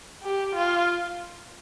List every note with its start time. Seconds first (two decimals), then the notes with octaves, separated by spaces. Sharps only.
0.24 G4
0.55 F4